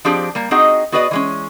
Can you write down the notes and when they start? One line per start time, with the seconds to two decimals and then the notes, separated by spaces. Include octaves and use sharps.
0.05 F3 C4 D4 G4 G#4 D5
0.35 G3 A#3
0.51 C4 D#4 F#4 G#4 D#5 F#5
0.92 B3 F#4 G#4 B4 D5 D#5
1.11 E3 G#3 C#4